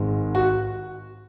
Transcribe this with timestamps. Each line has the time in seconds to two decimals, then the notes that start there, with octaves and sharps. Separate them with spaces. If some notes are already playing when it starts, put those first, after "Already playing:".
Already playing: G#1 G#2 G#3
0.35 F#4